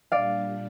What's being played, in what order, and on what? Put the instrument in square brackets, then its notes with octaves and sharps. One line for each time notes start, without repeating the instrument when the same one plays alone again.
[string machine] A#2 G3 D4 [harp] D5 F5